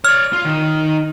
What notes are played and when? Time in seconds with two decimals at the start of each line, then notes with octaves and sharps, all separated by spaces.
0.05 C#5 D5 F6
0.33 F4
0.45 D#3